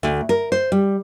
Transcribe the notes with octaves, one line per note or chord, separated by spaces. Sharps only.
D2
A#4
C5
G3